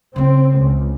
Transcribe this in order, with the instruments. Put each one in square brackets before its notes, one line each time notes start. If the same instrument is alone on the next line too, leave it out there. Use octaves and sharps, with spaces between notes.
[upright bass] C#3 E3 [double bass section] C4
[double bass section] C#2